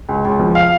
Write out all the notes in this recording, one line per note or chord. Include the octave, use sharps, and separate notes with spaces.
C#2
C#2
F3
F5